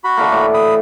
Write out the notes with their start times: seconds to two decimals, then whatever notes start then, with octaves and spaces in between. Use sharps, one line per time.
0.04 F#4 B5
0.17 D3 E3 A#3
0.32 A2
0.54 B5 D#6